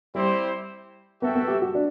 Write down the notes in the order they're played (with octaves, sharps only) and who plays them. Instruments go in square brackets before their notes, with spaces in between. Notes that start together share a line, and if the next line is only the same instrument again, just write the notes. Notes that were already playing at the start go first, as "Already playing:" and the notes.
[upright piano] G3 [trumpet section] C4 E4 G4 C5
[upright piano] B3 [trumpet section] F#4 A4 E5 G5
[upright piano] B3
G4
F#4
D4